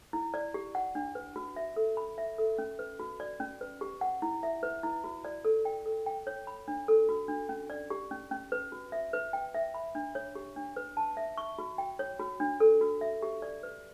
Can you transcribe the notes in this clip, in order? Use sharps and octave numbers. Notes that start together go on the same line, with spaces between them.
E4
D5
G4
F#5
D4
B4
F#4
E5
A4
B5
E5
A4
C#4
B4
F#4
D5
C#4
B4
G4
F#5
E4
E5
B4
E4
F#4
D5
A4
G5
A4
G5
C#5
B5
D4
A4
F#4
D4
C#4
D5
G4
C#4
C#4
B4
F#4
E5
B4
G5
E5
B5
D4
C#5
G4
D4
B4
A5
E5
C#6
F#4
G5
C#5
F#4
D4
A4
F#4
E5
G4
D5
B4